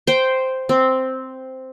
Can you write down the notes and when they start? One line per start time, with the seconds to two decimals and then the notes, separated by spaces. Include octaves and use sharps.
0.07 C5 G5
0.69 C4